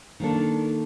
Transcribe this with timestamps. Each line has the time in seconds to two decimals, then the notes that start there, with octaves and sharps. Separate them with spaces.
0.20 D#3 A#3 D4 A4